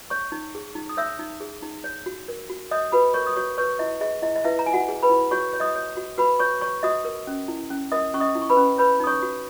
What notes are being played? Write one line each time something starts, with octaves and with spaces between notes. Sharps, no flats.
C#5 C#6
D#4
G#4
D#4
D#6
C#5 E5 E6
D#4
G#4
D#4
C#5
F#4
A#4
F#4
C#5 D#5 D#6
F#4 B4 B5
A#4 C#5 C#6
D#6
F#4 C#5 C#6
B4 C#5 C#6
E4 D#5
G#4 D#5
E4 D#5
D#5
E4 B4 E5
A#5
E4 G#5
F#4 F#5
G#4
B4 B5
E4
F#4 C#5 C#6
C#5
D#5 D#6
C#5
F#4
F#4 B4 B5
C#5 C#6
C#5 C#6
F#4 D#5 D#6
A#4
C#4
E4
C#4
A#4 D#5 D#6
C#4 C#6
D#5 D#6
E4
C#6
B4 B5
C#4
B4 C#5 B5
D#4 D#6
C#5 C#6
F#4